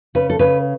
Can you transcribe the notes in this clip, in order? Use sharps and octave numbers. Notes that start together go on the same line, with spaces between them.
C#3 B4
A4
C#3 B4